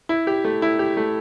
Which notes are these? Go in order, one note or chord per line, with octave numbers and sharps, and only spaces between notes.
E4
G4
A3
E4
G4
A3